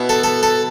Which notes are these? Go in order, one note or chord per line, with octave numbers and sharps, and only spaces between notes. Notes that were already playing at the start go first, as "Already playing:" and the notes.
Already playing: B2 B3 E4
A4
A4
A4